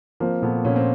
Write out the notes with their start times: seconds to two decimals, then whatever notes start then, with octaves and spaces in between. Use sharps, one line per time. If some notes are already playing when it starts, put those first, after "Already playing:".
0.20 F3 A#3 C4
0.42 A#2 A3 B3
0.65 A#2 C#4
0.76 C4